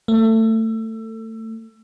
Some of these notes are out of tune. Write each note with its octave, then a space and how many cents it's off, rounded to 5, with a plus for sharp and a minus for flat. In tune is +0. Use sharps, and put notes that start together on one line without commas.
A3 +25